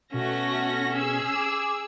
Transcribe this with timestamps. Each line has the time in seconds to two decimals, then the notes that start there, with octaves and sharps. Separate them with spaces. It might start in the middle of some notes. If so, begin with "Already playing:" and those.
0.14 B2 A3 C#4 F#4 A#6
0.94 G#4 E6
1.34 D6